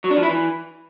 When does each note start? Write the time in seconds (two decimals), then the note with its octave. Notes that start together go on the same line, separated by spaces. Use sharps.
0.04 F#3
0.10 D4
0.17 F3
0.23 E4
0.29 E3